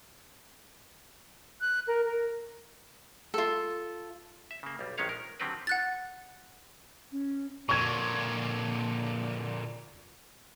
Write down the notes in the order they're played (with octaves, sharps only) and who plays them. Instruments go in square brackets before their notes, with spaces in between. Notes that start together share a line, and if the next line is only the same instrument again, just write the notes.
[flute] F#6
A#4
A#4
[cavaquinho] F4 A4
[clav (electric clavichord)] E5
C#3 A#3
B1 G3
A#1 D#3 G#3 C#4 C#5 F5
A#4
D3 D#3 F#3 C4 G4 B4
[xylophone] F#5 F#6 A6
[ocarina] C#4
[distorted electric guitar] A#2 D3 [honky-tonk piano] C#6 G#6